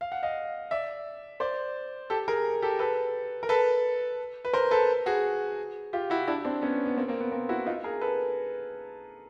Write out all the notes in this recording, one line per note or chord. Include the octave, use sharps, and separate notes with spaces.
F5
F#5
D#5 F5
D5 E5
C5 D5
G4 A4
G#4 A#4
G4 A4
A4 B4
A#4
A4 B4
B4
A#4 C5
A4 B4
F#4 G#4
F4 G4
E4 F#4
D4 E4
C4 D4
B3 C#4
B3
A#3 C4
A#3 C4
B3
A#3 C4
E4 F#4
D#4 F4
G#4 A#4
A4 B4